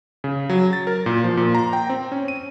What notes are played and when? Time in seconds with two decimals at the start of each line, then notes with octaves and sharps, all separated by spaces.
0.24 C#3
0.50 F#3
0.73 A6
0.87 A#4
1.06 A#2
1.24 F3
1.37 A#2
1.55 A#5
1.73 G5
1.90 C4
2.12 C#4
2.28 D#7